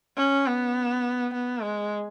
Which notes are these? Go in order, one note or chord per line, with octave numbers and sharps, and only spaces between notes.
C#4
B3
B3
G#3